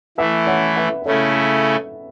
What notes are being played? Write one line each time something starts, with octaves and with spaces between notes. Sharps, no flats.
E3 A3 E4 B4 E5
C#5 F#5
B4 E5
B4
C#3 A3 C#4 E4 A4 C#5